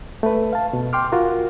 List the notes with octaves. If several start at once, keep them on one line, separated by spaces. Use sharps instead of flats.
A3 B4
F5 A5
B2
G5 C6 D6 F6
F4 F#4 A#4